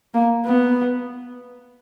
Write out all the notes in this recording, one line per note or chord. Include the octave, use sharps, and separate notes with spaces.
A#3
B3